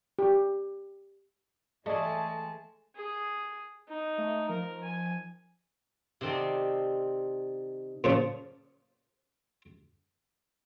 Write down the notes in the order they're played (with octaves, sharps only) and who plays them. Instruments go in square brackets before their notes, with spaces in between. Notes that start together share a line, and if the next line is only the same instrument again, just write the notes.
[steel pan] G4
[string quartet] E3 G#3 A5 [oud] A3 [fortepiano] G#4 D5 D#5
[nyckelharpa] G#4
D#4
[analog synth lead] A3
[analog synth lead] F3 [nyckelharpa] A#4
[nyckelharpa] G#5
[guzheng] C3 D#3 C4 A4 D5
[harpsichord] A#2 C#3 F3